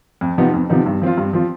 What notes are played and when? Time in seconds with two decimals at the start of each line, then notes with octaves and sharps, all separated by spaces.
0.21 F2
0.38 C3 F3 B3 D#4
0.54 F2
0.69 C3 F3 B3 D#4
0.86 G2
1.02 F3 C4 F4
1.18 G2
1.33 F3 C4 F4